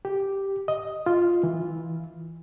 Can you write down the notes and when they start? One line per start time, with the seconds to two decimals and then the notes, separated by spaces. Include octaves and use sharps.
0.05 G4
0.68 D#5
1.06 F4
1.43 E3